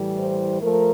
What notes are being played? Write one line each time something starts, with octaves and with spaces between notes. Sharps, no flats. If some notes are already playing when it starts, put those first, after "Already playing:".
Already playing: A2 E3 G3
C5
F3 A3 A#4